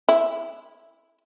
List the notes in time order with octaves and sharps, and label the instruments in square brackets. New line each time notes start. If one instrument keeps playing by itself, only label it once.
[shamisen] E4